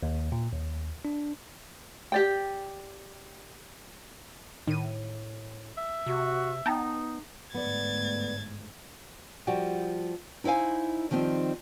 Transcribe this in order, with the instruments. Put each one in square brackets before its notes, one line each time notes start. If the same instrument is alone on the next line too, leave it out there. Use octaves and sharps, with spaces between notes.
[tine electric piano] D#2
A#2
D#2
D4
[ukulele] G4 D5 G5
[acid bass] A2 [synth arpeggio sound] D#3 D#7
[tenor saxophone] E5
[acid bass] C3 [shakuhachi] F#4
[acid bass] B3 [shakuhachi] D#4 [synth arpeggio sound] G5 A5 A#5
[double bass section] G1 G#2 A3 [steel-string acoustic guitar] B3 D5 [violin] G#6 A6
[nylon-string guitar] F3 G3 F#4 G4
D#4 E4 C5 F5 G#5
D#3 F3 G3 C4 D#4